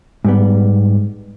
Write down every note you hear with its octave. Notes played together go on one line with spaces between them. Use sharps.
G#2 G3 B3